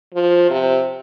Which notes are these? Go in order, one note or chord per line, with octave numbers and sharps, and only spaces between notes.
F3
C3